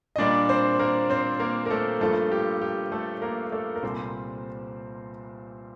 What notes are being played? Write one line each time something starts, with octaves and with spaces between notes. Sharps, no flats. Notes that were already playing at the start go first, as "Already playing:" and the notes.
D#5
A#2 G3 A#3 D4 D5
C4 C5
A#3 A#4
C4 C5
A#3 A#4
A#4
A3 A4
G2 F3 A3 A#3 A4
G4
G4
A3 A4
A#3 A#4
A3 A4
A#4
C2 A#2 G3 C4 C5